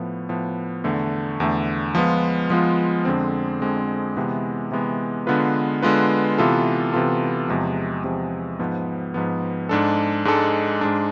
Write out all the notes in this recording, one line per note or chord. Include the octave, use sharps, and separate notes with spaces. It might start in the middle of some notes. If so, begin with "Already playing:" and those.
Already playing: A2 F3 B3
A2 F3 B3
E2 D3 A3
E2 D3 A3
F3 G#3 B3 F4
F3 G#3 B3 F4
F2 D3 G#3 C4
F2 D3 G#3 C4
C3 E3 G#3 B3
C3 E3 G#3 B3
D3 G#3 B3 F4 B4
D3 G#3 B3 F4 B4
C3 E3 B3 F4 A4
C3 E3 B3 F4 A4
E2 C3 F3 G#3
E2 C3 F3 G#3
G#2 F3 B3
G#2 F3 B3
G#2 G#3 D4 A4
G#2 G#3 D4 A4
G#2 G#3 D4